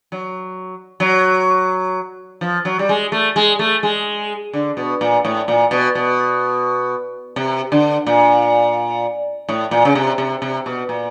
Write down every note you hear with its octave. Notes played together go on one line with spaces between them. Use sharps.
F#3
F#3
F3
F#3
G3
G#3
A3
G#3
A3
G#3
D3
B2
A#2
A2
A#2
B2
B2
C3
D3
A#2
A2
A#2
C#3
C3
C3
C3
B2
A#2